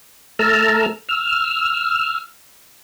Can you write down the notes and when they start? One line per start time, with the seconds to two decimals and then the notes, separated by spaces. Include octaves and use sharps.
0.39 A3 A5 A#5 E6 F6
1.09 E6 F6